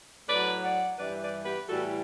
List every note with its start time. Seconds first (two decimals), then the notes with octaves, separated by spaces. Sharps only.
0.27 A2 F#3 B4 D5
0.63 D5 F#5
0.98 G2 E3 G3 B4 D5
1.21 B4 D5
1.44 G4 B4
1.68 A2 E3 G3 F#4 A4